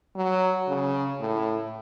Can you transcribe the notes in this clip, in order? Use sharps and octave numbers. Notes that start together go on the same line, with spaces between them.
F#3
C#3
A2